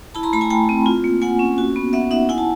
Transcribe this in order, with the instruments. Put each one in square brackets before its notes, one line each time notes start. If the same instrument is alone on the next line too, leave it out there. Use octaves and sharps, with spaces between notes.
[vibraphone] E4 A5 B5
A#5 C6
A3 A5 B5
G#5 A#5
A3 G5 A5
C4
F4
A#3
A#3 F#5 G#5
C#4
F#4
B3
B3 E5 F#5
D#4 E5 F#5
E4 F#5 G#5
A5